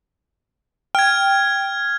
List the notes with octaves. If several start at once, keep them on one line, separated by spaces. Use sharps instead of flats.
G5 F6 G#6